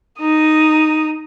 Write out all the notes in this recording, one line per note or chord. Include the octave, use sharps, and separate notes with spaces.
D#4 D#6